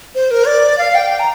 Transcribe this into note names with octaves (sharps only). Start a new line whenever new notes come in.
C5
A#4
D5
F5
G5
G5
A#5